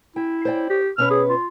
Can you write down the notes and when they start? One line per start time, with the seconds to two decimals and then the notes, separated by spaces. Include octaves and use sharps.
0.16 E4 G5
0.45 C5 D5 G5
0.70 G4
0.98 B2 C#4 B4 F6
1.11 G#4
1.29 F4